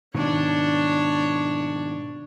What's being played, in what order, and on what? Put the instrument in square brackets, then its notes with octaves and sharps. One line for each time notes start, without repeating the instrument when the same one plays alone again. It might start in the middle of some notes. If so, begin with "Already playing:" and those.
[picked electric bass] G#2 B2 D#3 [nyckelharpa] D4 C#5